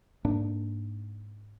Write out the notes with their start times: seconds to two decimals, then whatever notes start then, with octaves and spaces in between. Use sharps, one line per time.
0.25 G#2 A#3 D4